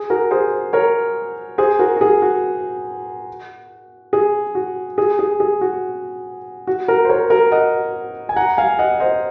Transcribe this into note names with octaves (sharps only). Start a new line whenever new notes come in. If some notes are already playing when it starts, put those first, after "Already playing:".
Already playing: G#4
F#4 A#4
G#4 C5
A#4 C#5
G#4 C5
F#4 A#4
F#4
G#4
F#4
G#4
F#4
G#4
G#4
G#4
F#4
F#4
F#4 A#4
C5
A#4 C#5
F#4 A#4
D#5 F#5
G#5
F#5 A#5
F5 G#5
D#5 F#5
C5 D#5